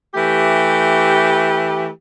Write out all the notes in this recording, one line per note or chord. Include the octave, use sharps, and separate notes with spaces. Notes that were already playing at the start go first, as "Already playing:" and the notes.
E3 A3 G4